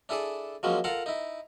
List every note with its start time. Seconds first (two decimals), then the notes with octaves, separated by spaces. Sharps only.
0.09 D4 E4 G#4 A4 D5
0.63 F3 F#3 G#3 A#3 C#4
0.84 F4 A4 A#4 F5 F#5
1.06 D#4 E4